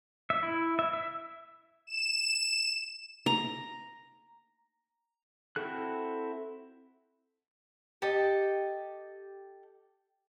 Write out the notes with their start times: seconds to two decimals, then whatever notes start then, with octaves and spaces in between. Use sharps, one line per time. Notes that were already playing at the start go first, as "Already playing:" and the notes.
0.30 E5
0.43 E4
0.79 E5
0.93 E5
1.87 E7
3.26 A#5
5.56 C4 E4 F#4 A4 F#6
8.02 G4 A4 D#5